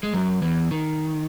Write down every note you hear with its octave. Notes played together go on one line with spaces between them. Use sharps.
G#3
F#2 F#3
E2 E3
D#3